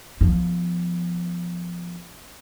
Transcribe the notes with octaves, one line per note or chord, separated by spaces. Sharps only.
F3 B3